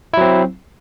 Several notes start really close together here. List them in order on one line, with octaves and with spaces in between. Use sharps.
E4 F#3 C4